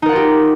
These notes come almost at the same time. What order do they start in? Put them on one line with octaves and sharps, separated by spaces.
D#4 A#4 F#5 F4 G4